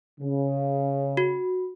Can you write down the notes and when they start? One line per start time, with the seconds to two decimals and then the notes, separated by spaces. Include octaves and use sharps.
0.21 C#3
1.17 F#4